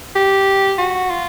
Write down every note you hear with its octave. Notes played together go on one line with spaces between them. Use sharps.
G4
F#4
F4